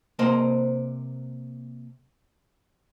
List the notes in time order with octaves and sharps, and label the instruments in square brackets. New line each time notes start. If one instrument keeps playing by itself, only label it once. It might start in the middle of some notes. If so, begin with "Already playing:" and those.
[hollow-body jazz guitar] C3 A#3 C5 D#5